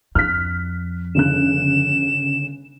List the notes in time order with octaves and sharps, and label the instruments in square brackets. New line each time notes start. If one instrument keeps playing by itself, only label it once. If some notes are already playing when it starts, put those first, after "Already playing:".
[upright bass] F2 [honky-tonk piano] F6 F#6 B6
[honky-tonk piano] G1 C#3 F#6 [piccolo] E7